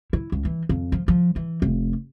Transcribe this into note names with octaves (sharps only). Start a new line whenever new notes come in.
E4
C#2
E3
F2
F3
F3
E3
F1